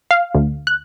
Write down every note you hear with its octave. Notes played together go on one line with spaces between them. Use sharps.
F5
D2
F#6